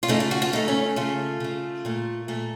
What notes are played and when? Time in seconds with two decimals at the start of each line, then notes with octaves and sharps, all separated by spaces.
0.03 F4
0.08 C#3 A3 D#4
0.20 F4
0.31 F#4
0.42 F4
0.53 C#3 A3 D#4
0.68 C#4
0.96 C#3 A3 F4
1.40 C#3 A3
1.85 A#2 A3
2.28 A#2 A3